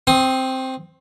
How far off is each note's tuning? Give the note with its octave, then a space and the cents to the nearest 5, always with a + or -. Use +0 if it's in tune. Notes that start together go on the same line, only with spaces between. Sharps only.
C4 +0 C6 +30 D#6 +0